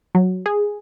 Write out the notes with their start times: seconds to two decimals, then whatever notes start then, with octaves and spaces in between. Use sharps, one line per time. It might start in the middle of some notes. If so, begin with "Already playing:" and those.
0.15 F#3
0.46 G#4